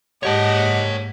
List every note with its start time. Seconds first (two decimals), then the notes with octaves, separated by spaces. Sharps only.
0.23 G#2 G4 C#5 D#5 F#5 A5